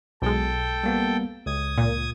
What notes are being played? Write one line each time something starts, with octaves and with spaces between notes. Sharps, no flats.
B1 G#3 A4 G5
G3 A#3 B3
C#2 D#6 G#6
A#2